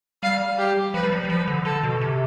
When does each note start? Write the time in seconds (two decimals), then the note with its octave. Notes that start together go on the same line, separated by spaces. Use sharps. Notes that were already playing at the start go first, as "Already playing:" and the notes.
0.23 G3 F5
0.58 G4
0.94 F3 B4
1.03 G3
1.12 F3
1.25 G3
1.30 F3 B4
1.48 D3
1.65 D3 A4
1.83 B2
2.01 C3